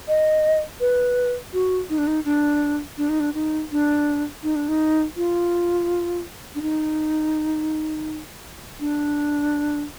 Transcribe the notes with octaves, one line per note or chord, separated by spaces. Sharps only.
D#5
B4
F#4
D#4
D4
D#4
D4
D4
D#4
D4
D#4
D4
D#4
D4
D#4
F4
D4
D#4
D4